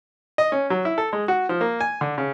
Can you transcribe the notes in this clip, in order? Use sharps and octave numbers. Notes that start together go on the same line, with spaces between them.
D#5
C#4
F#3
E4
A4
G#3
F#4
F3
A#3
G#5
D3
C#3